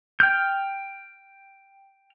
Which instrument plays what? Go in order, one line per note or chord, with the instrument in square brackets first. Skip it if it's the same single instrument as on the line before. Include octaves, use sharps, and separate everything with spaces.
[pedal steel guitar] G5 F6 G6